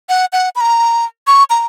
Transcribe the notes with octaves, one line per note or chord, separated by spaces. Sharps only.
F#5
F#5
B5
A#5
C#6
A#5